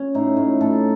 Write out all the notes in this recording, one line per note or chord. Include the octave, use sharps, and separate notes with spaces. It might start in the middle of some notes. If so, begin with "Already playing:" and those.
Already playing: C#4
A2 D#4
A2
A2 A4